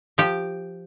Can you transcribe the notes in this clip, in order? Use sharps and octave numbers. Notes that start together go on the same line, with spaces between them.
F3 G4